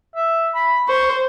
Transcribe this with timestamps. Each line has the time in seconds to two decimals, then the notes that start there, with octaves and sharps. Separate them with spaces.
0.15 E5
0.55 B5
0.88 C5 C#6